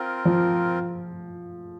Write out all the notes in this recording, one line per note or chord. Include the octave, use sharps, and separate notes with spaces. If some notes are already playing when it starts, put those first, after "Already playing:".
Already playing: C4 F4 A#4
F3